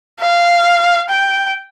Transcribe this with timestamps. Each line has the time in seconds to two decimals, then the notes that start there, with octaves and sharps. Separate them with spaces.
0.20 F5
1.09 G5